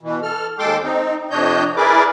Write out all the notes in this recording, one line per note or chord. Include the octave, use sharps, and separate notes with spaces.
B2 E3
A4 F6
D#2 G#3 A4 G5 C6 D6
C4 D#4
F2 C3 D4 C#5 D#5 G6
E4 G#4 A#4 B4 D5 D6